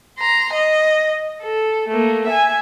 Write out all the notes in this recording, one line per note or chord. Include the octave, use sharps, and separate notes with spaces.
A#5 C6
D#5
A4
A3 A#3
E5 G#5